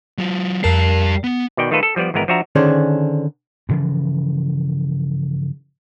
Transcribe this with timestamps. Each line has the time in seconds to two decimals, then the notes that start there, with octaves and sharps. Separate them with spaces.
0.18 F#3 F4
0.63 F2 G3 A#4 A5 C7
1.24 B3
1.57 B2 D#3 D5 G5
1.71 D#3 A3 F4 A4 B4
1.83 A4
1.96 F3 G3 B3 D5
2.14 G#1 E3 G#3 B3 A#4
2.28 F3 D4 F#4 E5 A#5
2.55 D3 D#3 C#4 D4 G#4 C5
3.69 G2 C#3 E3 F3